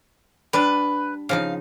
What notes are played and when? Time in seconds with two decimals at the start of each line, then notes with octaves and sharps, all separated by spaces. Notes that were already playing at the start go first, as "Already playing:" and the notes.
0.53 G3 D4 B4
1.29 C#3 F3 D#4 F5